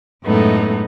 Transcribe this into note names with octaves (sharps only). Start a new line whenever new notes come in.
F#2 A2 G#3 A3 B3 D#4